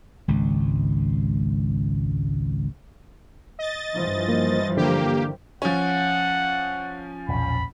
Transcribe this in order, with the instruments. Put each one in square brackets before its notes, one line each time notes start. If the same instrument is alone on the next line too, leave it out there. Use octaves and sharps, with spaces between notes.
[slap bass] G#1 C#2
[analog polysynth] D#5 A6
[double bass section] G2 E3 F3
[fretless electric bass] A#3
[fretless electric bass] D3 [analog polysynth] A#3 G4
[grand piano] F3 C#4 [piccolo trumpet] F#5
[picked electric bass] E1 A#1 [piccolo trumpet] B5